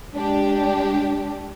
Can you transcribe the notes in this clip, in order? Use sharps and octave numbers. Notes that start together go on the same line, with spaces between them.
G#3 D4 G4